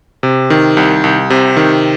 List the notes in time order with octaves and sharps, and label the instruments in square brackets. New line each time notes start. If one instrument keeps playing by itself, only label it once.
[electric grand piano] C3
D#3
C2
C2
C3
D#3